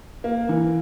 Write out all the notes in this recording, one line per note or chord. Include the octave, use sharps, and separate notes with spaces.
A#3
E3